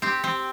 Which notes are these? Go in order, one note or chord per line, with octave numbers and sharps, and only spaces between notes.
C4 G4
C4